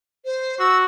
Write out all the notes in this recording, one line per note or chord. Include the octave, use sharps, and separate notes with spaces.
C5
F#4 E6